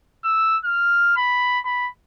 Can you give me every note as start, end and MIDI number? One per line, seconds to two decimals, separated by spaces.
0.24 0.57 88
0.64 1.14 89
1.17 1.59 83
1.65 1.89 83